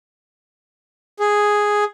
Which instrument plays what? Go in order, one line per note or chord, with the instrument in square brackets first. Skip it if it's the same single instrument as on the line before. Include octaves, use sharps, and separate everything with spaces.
[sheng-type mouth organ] G#4